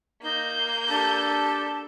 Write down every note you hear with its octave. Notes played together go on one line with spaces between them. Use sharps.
A#3 D#4 G6
D4 G4 A4 A5